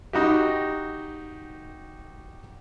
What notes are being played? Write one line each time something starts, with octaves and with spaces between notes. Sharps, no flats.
D#4 F#4 G4